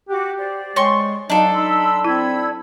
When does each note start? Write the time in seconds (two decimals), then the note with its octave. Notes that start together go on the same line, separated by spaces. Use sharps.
0.09 F#4 G4 D6 F#6
0.38 C5 D5
0.76 G#3 C#5 G5 G#5 C6 C#6
1.30 F#3 D4 D#4 F#4 A4 C5 D#5 F5
1.53 D#4 B5 C6 E6
2.05 C4 E4 B5 E6 G#6